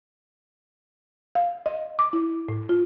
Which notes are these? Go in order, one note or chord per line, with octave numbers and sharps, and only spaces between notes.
F5
D#5
D6
E4
A2
F4